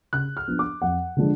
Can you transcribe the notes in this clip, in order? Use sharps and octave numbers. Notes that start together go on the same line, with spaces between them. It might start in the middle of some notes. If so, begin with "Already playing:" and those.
C#3 F#6
F6
F3 B3 D4
D6
F2 F#5
D3 F3 G#3 D4